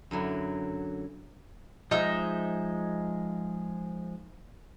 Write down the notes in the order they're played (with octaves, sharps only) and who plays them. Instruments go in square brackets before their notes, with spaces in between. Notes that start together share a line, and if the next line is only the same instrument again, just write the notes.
[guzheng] F#2 D3 F#3 E4
[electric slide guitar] F3 G#3 [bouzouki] D#4 E5